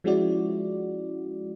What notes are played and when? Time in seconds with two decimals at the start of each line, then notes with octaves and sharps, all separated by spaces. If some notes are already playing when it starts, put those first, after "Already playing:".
0.04 F3 G#3 C#4 E4 F#4 D5